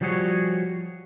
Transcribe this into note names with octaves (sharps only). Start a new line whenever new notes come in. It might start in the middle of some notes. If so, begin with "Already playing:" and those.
F3 G3 F#4 G#4 C#5